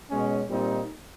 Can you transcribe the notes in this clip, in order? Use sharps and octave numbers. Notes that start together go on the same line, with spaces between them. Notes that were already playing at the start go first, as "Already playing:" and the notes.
B2 G#3 C#4
A#2 G3 C4 D#4